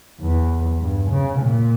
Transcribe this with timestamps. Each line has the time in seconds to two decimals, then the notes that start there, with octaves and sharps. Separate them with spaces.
0.21 E2
0.80 G2
1.10 C#3
1.40 A#2